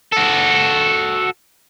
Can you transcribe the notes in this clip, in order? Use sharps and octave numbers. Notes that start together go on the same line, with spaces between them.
F#4 A4